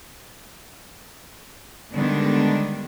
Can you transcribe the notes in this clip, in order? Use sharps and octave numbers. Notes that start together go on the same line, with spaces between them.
D3 D#3 G3 G#3 B3 D4